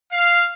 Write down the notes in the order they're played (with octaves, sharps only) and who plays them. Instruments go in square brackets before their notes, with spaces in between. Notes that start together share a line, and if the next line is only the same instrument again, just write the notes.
[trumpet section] F5